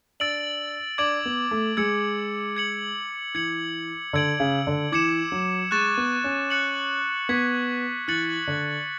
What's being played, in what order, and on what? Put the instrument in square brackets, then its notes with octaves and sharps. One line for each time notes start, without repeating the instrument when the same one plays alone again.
[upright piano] D4 [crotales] E6 A6 D7 F#7
[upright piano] D4 [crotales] D6 G#6 D7 F#7
[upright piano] B3
A3
[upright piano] G#3 [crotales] E6 G#6 C#7
[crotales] G#6 C#7 F#7
[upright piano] E3 [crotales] G#6 C#7 F#7
[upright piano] D3 [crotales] E6 G#6 D7 F#7
[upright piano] C#3
D3
[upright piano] E3 [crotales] D6 G#6 C#7 E7
[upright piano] F#3
[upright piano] G#3 [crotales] C#6 F#6 A6 E7
[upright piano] B3
C#4
[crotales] F#6 C#7 F#7
[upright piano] B3 [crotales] C#6 G#6 B6
[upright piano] E3 [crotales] F#6 A6 C#7 F#7
[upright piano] D3